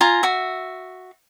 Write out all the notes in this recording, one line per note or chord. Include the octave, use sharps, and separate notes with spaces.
F4 G#5 A#5
F#4 E5